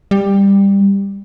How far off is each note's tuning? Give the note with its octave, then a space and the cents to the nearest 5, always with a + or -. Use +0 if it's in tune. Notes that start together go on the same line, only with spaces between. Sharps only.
G3 +15